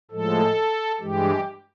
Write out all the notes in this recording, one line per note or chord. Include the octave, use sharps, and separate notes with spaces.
A2 F3 G#3 A4
G2 E3 G#3 G4